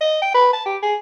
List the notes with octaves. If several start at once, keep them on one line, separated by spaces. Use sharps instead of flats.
D#5
G5
B4
A5
G4
G#4